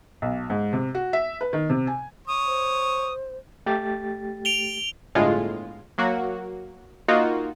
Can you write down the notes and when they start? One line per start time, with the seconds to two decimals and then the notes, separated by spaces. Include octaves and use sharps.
0.22 B1
0.50 G#2
0.73 C3
0.95 F#4
1.13 E5
1.41 B4
1.53 D#3
1.70 C3
1.87 G#5
2.27 C#5 D#6
2.47 C5
3.66 A3 G4 A6
4.45 D7 F7 G7
5.15 G1 A2 G#3 F4
5.98 F#3 A#3 F#4
7.08 A#3 D#4 F4 F#4